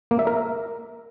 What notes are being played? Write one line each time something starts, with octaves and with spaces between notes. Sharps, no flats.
A#3
E5
A#4